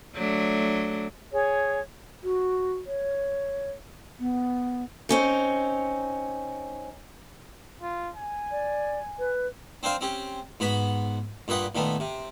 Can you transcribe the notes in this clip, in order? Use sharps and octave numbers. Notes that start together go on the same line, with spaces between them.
F#3 A3 D4
G#4 C#5
F#4
C#5
B3
C4 C#4 D#4
F4
G#5
D5
B4
C4 D4 C5 F5
C4 C#4 G4
G#2 B3 F#4 B5
G2 A#2 B4 D#5 F#5
A#2 D#3 A3 B3
C3